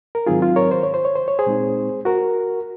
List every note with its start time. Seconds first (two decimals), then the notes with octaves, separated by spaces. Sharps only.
0.15 A#4
0.26 G#2 D#3 F#3 C4 D#4 F4 G#4
0.42 F4
0.56 A#4 C#5
0.71 C5
0.83 C#5
0.94 C5
1.05 C#5
1.16 C5
1.28 C#5
1.39 G#4 C5
1.46 A#2 G#3 C4 D#4
2.05 F#4 A#4